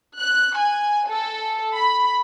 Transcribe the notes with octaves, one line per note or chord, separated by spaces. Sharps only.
F#6
G#5
A4
B5